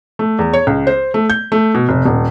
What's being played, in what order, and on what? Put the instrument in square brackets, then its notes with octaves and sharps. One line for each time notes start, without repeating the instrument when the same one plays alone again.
[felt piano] A3
E2
C#5
C#2
C5
A3
G6
A3
B2
F1
D#1